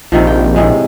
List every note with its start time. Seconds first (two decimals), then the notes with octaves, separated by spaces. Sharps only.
0.12 A#1 C3 D#3 F3
0.27 G5
0.56 A2 C3 G#3